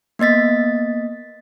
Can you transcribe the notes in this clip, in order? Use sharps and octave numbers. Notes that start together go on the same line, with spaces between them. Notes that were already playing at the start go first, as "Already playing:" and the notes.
A#3 B3 D#5 A6 B6